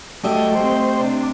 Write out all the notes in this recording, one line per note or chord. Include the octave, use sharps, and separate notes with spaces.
F#3 G3 A3 G4 D#5 E5
A3 C4 C5
C3 D4